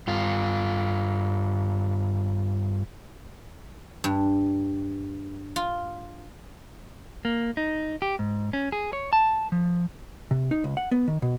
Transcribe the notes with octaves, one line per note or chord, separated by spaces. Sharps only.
G2 F4
G2
F4
A#3
D#4
G4
G#2
C#4
G#4
C#5
A5
F3
C3
D#4
C#2
F#5
B3
D#3
B2